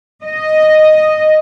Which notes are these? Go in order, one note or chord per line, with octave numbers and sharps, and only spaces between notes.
D#5